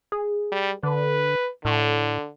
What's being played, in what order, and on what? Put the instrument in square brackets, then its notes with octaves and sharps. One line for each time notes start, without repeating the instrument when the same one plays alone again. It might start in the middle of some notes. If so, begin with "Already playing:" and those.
[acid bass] G#4
[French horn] G3
[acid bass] D3 [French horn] B4
[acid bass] A2 [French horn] D3